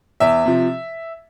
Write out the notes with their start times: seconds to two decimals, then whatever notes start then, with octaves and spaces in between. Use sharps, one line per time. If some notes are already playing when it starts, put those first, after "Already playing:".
0.20 E2 E5
0.45 C3 F3